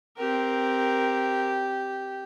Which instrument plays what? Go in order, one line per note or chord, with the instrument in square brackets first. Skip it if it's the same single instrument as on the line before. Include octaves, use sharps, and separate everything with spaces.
[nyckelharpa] C4 A#4 [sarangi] G4